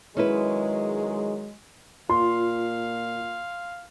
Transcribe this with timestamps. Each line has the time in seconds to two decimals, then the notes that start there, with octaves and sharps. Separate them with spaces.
0.17 D#3 F#3 G#3 C#4 E4 B4
2.10 A#2 F4 F5 C6